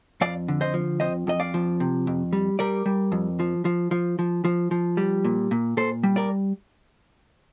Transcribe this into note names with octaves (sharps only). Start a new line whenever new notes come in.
F2 D5 F5
D3
C5 D#5
F3
F2 C5 D#5
F2 D#5
D5 F5
F3
C3
F2
G3
G3 A#4 D5
G3
F2
F3
F3
F3
F3
F3
F3
G3
A#2
A#2
A#2 A4 C5
G3
A#4 D5